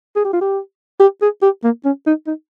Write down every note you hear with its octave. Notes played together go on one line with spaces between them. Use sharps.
G#4
G4
F4
G4
G4
G#4
G4
A#3
C#4
D#4
D#4